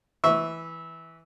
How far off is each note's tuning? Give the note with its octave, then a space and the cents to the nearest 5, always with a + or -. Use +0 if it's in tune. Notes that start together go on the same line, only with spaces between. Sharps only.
E3 +0 E5 -20 C#6 +0